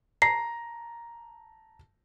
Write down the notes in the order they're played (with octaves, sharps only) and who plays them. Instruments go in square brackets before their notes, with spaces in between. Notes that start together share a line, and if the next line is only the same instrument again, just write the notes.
[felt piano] A5 A#5 A#6 [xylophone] C7